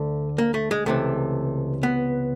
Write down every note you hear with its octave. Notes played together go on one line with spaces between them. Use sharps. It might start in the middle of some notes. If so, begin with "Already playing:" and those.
Already playing: D2 D3 A3
A#3
A3
G#3
C#2 C3 E3 A3
B3